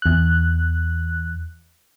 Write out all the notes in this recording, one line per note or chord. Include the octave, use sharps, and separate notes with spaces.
E2 F#6